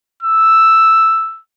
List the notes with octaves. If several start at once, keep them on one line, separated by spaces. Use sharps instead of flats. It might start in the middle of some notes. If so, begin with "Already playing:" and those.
E6